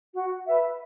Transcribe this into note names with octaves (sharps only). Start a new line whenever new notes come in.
F#4
B4 E5